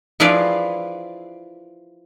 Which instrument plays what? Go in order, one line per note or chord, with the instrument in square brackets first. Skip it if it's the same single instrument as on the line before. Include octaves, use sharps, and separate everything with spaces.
[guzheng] F3 E4 G#4 B4 D5 F5